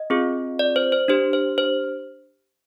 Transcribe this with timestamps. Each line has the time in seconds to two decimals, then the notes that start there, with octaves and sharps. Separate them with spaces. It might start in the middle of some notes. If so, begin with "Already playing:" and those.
Already playing: D#5
0.10 C4 F4 G#4
0.59 D5
0.76 C5
0.92 C5
1.08 D4 G4 C5
1.33 C5
1.58 C5